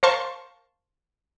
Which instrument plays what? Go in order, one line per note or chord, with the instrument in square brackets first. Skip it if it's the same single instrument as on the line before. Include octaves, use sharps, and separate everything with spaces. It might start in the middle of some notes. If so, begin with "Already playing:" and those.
[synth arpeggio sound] A#4 C5 F5 A5 C6 C#6